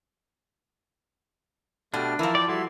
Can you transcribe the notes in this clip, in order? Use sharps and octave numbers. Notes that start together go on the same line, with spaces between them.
B2 A3 D4 G4 F6
E3 F3 A#4 E5 A5
D5 G5 A5
G3 E4 F#4 A4 C6